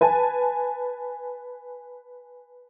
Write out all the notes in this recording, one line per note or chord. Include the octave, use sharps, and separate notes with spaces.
B4 G#5 A5